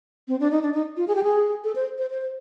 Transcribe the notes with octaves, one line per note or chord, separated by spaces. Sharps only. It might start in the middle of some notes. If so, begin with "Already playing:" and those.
C4
D4
D#4
D4
D#4
F4
G#4
G4
G#4
A4
C5
C5
C5